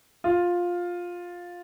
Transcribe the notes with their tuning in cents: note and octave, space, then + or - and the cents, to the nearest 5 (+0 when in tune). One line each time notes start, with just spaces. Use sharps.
F4 +10